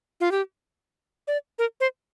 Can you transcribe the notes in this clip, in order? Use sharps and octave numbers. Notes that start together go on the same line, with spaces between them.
F4
G4
D5
A#4
C5